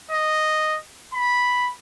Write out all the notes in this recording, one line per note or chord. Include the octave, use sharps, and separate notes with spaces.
D#5
B5